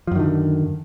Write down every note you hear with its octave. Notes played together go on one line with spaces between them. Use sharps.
F#2 D3 D#3 F3